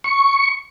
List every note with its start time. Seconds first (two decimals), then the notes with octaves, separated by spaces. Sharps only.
0.04 C#6